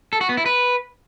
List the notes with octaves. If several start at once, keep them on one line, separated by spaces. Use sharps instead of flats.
A4
F#4
B3
E4
B4